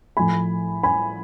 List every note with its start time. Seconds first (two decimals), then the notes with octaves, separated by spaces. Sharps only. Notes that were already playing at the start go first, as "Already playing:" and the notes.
0.17 A2 F3 A3 G#5 B5
0.83 G#5 B5